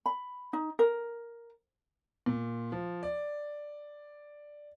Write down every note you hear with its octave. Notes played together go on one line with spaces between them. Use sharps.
B5
D#4
A#4
A#2
F3
D5